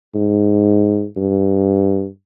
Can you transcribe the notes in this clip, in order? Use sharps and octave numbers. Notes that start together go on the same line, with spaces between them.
G#2
G2